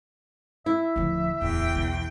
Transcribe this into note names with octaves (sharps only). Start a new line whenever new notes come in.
E4 E5
D1 F3
D1 E2 G5
B1 E3